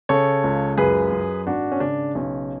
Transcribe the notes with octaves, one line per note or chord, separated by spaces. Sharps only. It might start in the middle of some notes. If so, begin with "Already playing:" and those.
C#3 A4 C#5
C#2
F#2 G#4 B4
F#2
G#1 D4 F#4
C#4
C#3 D4
B1 C#4